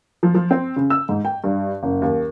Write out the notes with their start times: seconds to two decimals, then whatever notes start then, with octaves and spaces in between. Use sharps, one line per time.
0.23 F3
0.35 F3
0.51 C4
0.76 C#3
0.90 E6
1.09 G#2
1.25 G5
1.44 G2
1.83 F#1
2.02 D#2